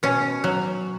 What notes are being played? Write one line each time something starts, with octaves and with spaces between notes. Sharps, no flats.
B2 C#4
F#3